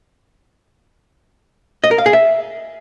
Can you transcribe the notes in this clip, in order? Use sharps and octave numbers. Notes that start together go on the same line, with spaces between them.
D#5
A#4
F5
G#4
E5